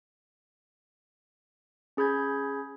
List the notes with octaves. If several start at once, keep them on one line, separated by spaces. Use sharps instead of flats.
C#4 G#4 B5 G6 G#6